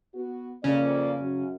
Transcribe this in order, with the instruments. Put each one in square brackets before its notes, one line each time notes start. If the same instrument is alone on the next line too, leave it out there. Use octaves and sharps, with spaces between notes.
[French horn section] B3 F#4
[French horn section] F2 A#3 D5 [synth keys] C#3 C#4
[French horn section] F#2